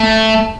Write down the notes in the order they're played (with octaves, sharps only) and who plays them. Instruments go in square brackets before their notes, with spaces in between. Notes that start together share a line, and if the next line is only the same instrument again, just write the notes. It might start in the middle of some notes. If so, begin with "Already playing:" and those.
Already playing: [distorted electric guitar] A3